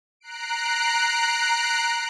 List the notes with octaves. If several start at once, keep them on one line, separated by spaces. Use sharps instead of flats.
A#5 F#6 C7 D7